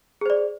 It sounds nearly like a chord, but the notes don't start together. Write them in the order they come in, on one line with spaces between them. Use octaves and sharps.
G#4 C5 D5